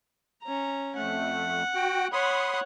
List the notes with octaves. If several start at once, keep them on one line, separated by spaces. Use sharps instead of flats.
C#4 A#5
F2 A3 F#5
F#4 G5
C#5 F#5 B5 C6 D#6